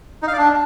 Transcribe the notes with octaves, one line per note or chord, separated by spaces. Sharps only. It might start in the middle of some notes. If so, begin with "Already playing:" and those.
D#4
F5
D5
D4